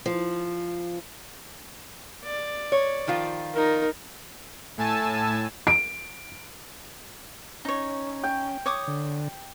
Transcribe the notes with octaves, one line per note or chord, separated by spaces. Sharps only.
F3
D5
C#5
D#3 F3 F4
D#4 A#4
A2 G#5 A5 E6
D7
C#4 D#4 C#5
G5
C#5 D6 D#6
D3